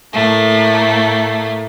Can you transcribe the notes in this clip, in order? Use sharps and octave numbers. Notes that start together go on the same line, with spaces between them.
A2 A3 A#3